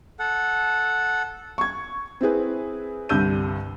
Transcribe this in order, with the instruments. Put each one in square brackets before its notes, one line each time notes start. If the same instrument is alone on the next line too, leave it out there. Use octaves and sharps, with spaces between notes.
[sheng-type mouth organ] A4 F#5
[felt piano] C#6 G#6
C4 E4 G#4 B4
C2 G2 D3 E6 G6 D#7